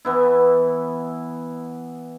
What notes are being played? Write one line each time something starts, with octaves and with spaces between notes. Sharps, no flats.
E3 B3 E4